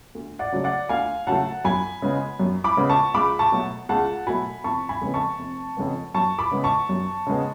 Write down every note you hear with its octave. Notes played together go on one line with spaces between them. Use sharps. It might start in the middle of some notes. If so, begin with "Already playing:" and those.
D2
D5 F#5
C#3 F#3 A3
D5 F#5
D2 F5 G#5
C#3 F#3 A3 F#5 A5
F#2 G#5 B5
C#3 G#3 B3
F#2
B5 D6
C#3 G#3 B3
A5 C#6
C#2 B5 D6
A5 C#6
B2 F#3 A3
C#2 F#5 A5
B2 F#3 A3 G#5 B5
F1 A5 C#6
G#5 B5
F2 C#3 G#3 B3
A5 C#6
F1
F2 C#3 G#3 B3
F#2 A5 C#6
B5 D6
C#3 G#3 B3
A5 C#6
F#2
C#3 G#3 B3